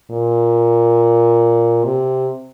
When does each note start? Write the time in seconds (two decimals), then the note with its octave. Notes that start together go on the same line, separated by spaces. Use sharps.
0.11 A#2
1.85 C3